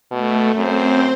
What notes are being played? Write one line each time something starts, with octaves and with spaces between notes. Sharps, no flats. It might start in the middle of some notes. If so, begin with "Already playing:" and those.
B2 A3
F#2 C4 C5